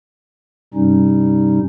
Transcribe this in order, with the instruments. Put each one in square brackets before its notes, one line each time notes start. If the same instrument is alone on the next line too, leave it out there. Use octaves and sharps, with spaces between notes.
[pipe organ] G2 C3 G3 C#4 D#4